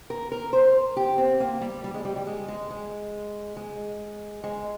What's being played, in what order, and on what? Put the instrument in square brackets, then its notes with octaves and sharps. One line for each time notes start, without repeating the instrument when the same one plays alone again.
[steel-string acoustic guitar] A#4
A#4
C5
G4
C4
A#3
G3
G3
G#3
G3
G3
G#3
G#3
G#3
G#3
G#3